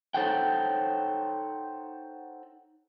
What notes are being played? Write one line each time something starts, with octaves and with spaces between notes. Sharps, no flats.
D#4 A4 C5 C#5 F#5 G5